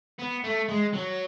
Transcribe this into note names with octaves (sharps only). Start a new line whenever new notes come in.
B3
A3
G#3
F#3